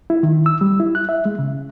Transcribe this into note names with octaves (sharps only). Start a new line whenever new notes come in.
E4
D#3
E6
G3
E4
F#6
E5
G#3
C#3